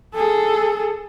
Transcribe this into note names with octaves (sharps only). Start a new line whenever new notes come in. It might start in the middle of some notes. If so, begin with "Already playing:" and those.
G#4 A4